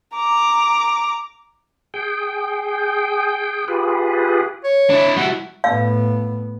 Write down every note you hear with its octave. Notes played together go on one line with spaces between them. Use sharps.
A#5 D6
G#4 G5
F4 G4 G#4 B4
C#5
D4 E4
G3 E4 F#4
A2 B3 F5